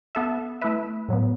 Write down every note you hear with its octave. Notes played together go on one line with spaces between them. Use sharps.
B3 A4 E5
A3 E4 B4 E5
A2 F#3 B3